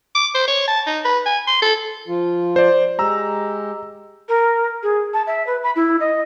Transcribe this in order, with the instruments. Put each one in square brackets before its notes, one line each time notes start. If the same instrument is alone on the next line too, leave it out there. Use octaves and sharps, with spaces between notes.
[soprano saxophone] D6
C5
C#5
A5
D#4
B4
G#5
C6
A4
[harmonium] F3 F4
[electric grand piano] C5 D5
[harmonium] G#3 G4 [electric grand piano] A#5 E6
[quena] A#4
G#4
A5
E5
B4
B5
E4
D#5